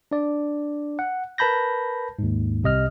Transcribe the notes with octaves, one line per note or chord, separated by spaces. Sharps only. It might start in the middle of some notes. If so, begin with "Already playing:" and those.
D4 D5
F#5
A#4 B4 A5 B5 G6 A#6
D#2 G#2
C2 C3 D#5 F6